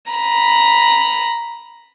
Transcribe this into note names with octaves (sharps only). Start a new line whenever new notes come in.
A#5 B5